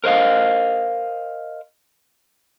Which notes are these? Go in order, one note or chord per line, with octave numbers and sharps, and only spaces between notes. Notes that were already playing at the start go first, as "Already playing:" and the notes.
A#4 C5 D#5 F5